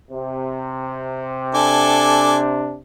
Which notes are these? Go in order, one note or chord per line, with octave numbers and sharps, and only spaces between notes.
C3
D4 A4 G#5 D6